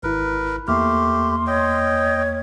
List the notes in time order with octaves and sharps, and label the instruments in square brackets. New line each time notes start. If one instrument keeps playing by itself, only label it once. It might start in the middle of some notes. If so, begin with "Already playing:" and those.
[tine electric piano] G#1 E4 [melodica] A#4 B4
[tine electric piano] E2 A#3 F6 [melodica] A3 G4 [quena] C6
[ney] C#5 [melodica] D#5 G5